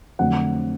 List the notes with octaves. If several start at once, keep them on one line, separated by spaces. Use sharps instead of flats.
F2 D3 F#3 A3 C4 F#5